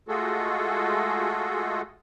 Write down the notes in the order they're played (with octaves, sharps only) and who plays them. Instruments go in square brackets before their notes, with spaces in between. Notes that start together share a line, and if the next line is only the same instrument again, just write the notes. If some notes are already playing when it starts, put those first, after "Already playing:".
[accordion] G#3 A3 F4 F#4 G#4 A4